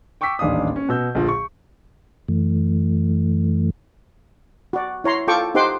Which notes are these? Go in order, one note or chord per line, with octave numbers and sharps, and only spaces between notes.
G5 C#6 D6 E6 B6
D#1 A1 D4 D#4 F5 D#6
C#4
B2 F#4 E6 G6
A#1 D3 F3
C#6
F#2 E3 A3
F#4 D5
E4 C#5 A#5 C6
F4 A4 G5 C#6 D6
D#4 G4 C5 F#5 C6 D6